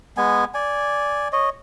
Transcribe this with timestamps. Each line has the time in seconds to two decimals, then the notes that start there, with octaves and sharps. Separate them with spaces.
0.17 G#3 B3 G#5
0.54 D5 G#5
1.32 C#5 D#5